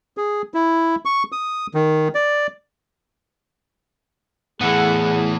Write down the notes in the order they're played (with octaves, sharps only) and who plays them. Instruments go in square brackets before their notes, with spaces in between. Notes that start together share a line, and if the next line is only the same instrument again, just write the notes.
[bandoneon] G#4
E4
C#6
D#6
D#3
D5
[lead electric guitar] A2 [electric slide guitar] E3 B3 [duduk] G#4 [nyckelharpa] F#5